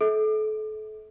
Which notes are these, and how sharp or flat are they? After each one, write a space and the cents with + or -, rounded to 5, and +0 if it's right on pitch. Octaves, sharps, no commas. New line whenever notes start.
A4 -35 E5 -35